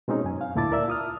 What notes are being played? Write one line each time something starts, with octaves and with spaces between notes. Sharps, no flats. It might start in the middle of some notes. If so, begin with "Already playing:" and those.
B2 G#3 C4 C#4 D#4
F#2 G#5
F5
D2 A#2 E4 A5 D6 A6
A#4 D5 E5 E6
F4 D#6 F6